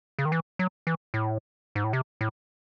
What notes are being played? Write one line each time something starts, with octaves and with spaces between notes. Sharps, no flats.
C#3
D#3
E3
F#3
E3
A2
G#2
A2
C3
A2